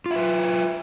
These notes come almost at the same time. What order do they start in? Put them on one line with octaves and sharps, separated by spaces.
F4 E5 B4